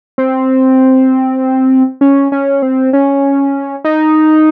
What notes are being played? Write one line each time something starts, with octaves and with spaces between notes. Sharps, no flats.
C4
C#4
C#4
C4
C#4
D#4